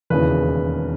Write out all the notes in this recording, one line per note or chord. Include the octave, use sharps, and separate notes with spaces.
E1 D#2 C#3 E3 B4